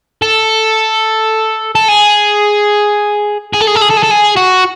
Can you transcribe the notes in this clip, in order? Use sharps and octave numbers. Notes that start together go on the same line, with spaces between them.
A4
A4
G#4
G#4
A4
G#4
A4
G#4
A4
G#4
A4
G#4
F#4